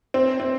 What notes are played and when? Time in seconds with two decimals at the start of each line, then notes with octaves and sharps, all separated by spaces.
0.14 C4
0.40 C4